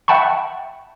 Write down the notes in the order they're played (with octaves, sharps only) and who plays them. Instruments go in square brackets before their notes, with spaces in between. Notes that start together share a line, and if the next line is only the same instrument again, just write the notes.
[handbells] E5 F#5 G5 A5 B5 C#6